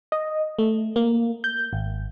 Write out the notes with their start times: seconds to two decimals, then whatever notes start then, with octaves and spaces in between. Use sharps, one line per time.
0.12 D#5
0.59 A3
0.96 A#3
1.44 G6
1.73 G#1